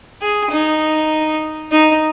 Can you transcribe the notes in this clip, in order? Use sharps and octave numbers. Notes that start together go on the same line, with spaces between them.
G#4
D#4
D#4